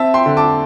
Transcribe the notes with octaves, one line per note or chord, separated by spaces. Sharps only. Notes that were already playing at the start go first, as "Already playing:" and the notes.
Already playing: C4 E5 A5
G5 C6
D3
A5 D6